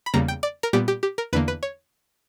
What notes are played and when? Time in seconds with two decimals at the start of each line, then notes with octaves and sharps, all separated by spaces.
0.06 B5
0.14 E2 C#3 G3 A#3 A#5
0.28 G5
0.43 D5
0.63 A#4
0.73 A#2 G3 B3 G4
0.88 G4
1.03 G4
1.18 A#4
1.33 E2 D3 A#3 B4
1.48 B4
1.63 C#5